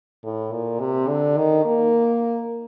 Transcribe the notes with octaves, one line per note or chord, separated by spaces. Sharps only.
A2
A#2
C3
D3
D#3
A#3